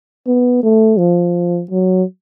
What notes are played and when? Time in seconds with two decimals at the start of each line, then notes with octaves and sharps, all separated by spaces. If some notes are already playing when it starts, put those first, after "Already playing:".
0.27 B3
0.63 A3
0.98 F3
1.71 F#3